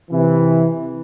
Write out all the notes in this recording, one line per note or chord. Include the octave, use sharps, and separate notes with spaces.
C3 E3